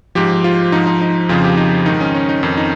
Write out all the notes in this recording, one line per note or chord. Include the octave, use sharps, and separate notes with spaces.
G#2 F3 G4
F4
G#2 F3 D#4
D#4
D#4
F2 C#3 F3 F4
G4
D#4
G#2 D#3 D#4
C#4
C#4
D#4
F2 D#3 C#4
D#4